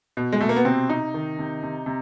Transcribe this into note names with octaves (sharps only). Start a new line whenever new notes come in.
B2
G#3
B2 A3
A#3
B3
C3 C4
C3 D#4
D#3
C3
C3
C3